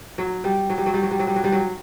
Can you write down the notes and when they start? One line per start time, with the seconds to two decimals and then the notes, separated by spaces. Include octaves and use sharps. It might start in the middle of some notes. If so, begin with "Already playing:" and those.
0.18 F#3
0.44 G3
0.70 F#3
0.78 G3
0.86 F#3
0.94 G3
1.03 F#3
1.11 G3
1.19 F#3
1.27 G3
1.36 F#3
1.44 G3
1.52 F#3